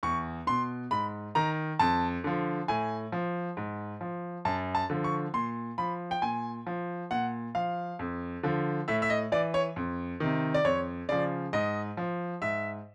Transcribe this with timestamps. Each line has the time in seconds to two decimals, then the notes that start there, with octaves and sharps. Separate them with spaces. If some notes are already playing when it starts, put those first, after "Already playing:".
0.03 E2 C#6
0.47 B2 C6
0.91 G#2 B5
1.35 D#3 A#5
1.79 F2 A5
2.24 D3 F3
2.68 A2 G#5
3.12 F3
3.57 G#2
4.01 F3
4.45 F#2 A5
4.75 A5
4.90 D3 F3
5.04 C#6
5.34 A#2 C6
5.78 F3 B5
6.11 G5
6.22 A#2 G#5
6.67 F3
7.11 A#2 F#5
7.55 F3 F5
7.99 F2
8.43 D3 F3
8.88 A2 E5
9.02 E5
9.10 D#5
9.32 E3 D5
9.54 C#5
9.76 F2
10.20 C3 D#3
10.54 D5
10.65 F2 C#5
11.09 C#3 F3 D5
11.53 G#2 D#5
11.97 F3
12.42 G#2 E5